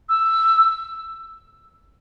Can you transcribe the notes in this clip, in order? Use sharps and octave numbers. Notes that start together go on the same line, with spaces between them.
E6